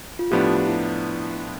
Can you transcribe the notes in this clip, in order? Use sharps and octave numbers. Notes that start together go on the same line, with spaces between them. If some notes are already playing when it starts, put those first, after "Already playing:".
F4
A2 F3 B3 D4 G4
E4